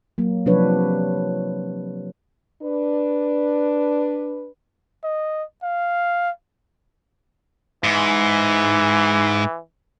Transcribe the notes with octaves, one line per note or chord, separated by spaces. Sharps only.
F#3 A#3
C3 F3 F#3 D4 B4 C#5
D4 B4
D#5
F5
G#2 E3